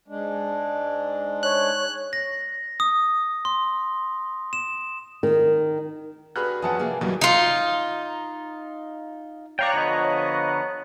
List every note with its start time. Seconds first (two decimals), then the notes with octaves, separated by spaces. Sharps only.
0.08 G#2 G#3 D4
1.43 C#5 F#6
2.13 A#6
2.80 D#6
3.45 C6
4.53 E7
5.23 D#3
6.36 G2 F#4 G#4 B4 B5 F6 F#6
6.62 E3 F3 C#4 F#5 A5 D#6
6.79 C3 A#3 G#4
7.01 E2 B2 D#3 E3 F#3 G3 A#3
7.21 D#4 F4
9.59 C#5 D5 F5 G5 A#5 F#6
9.74 D3 F3 B3 D#5